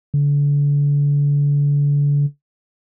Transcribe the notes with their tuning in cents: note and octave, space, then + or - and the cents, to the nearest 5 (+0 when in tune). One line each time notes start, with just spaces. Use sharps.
D3 -35